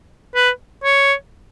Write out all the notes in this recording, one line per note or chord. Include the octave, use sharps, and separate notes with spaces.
B4
C#5